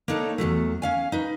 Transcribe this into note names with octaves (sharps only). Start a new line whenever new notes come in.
A#3 D4 D#4 A4 C#5
E2 D#3 F#3 A3
C#4 F5 G#5
D#4 B4